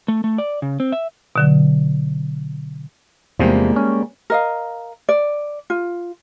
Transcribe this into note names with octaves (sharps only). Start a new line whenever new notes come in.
A3
A3
D5
C#3
C4
E5
B2 D3 F#3
E2 C3 F3 G3 G#3 A#3
C#4
A#4 D#5 F5
D5
F4